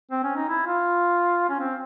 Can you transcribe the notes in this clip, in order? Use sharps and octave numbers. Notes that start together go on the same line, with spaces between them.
C4
C#4
D#4
E4
F4
C#4
C4